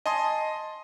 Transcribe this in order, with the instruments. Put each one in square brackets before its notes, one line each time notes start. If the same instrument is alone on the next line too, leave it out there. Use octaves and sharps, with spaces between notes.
[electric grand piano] D#5 G#5 A5 C6 D#6